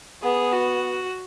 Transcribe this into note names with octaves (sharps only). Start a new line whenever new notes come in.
B3 G#4
F#4